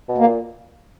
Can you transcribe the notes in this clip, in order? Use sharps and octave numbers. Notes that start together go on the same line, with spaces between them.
B2
A#3
A#2